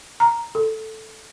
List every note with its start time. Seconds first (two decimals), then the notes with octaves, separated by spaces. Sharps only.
0.20 A#5
0.55 A4